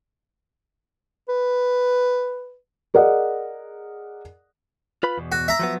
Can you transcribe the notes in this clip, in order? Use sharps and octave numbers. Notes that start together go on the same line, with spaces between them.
B4
G#4 A#4 D5 D#5 F#5
F4 B4 B5
E2 B2
F#4
E5 A#5
F3 F#3 B3